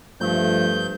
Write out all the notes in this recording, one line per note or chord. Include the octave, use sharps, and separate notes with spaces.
G2 F3 A3 G6